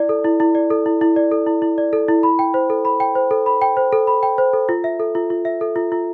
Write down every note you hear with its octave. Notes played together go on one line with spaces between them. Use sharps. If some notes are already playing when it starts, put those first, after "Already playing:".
Already playing: E4 D5
A4
E4
E4
D5
A4
E4
E4
D5
A4
E4
E4
D5
A4
E4
B5
G5
C5
A4
B5
G5
C5
A4
B5
G5
C5
A4
B5
G5
C5
A4
F4
E5
A4
F4
F4
E5
A4
F4
F4